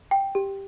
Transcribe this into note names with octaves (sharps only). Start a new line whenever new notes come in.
G5
G4